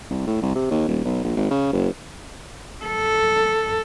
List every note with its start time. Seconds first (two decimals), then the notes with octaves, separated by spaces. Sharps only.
0.10 C2
0.27 A2
0.42 C2
0.55 C3
0.71 D#2
0.88 D#1
1.05 B1
1.24 A#1
1.36 G#1
1.51 C#3
1.73 F#1
2.85 A4